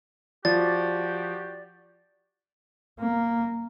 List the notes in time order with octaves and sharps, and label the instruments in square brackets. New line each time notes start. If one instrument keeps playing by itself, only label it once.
[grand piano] F3 [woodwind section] F#4 G4 [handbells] D5 [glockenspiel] A6
[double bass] A#3